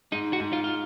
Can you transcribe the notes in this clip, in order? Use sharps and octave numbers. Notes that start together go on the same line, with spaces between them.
G#2 D#4
F#4
G#2
F4
F4